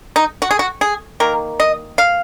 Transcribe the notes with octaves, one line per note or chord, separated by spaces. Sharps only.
D#4
F#4
G#4
F#4
G#4
D#3 A#3 A#4
D#5
F5